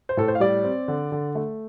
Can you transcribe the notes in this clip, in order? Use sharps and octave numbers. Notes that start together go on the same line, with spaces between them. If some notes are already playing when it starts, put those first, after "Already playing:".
C5
A2 A4
C5
F5
G3 D5
C4
D3
D3
A3